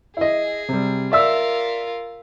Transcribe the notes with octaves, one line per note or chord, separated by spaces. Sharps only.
E4 G#4 D#5
C3 G3
F4 A#4 D5 E5 E6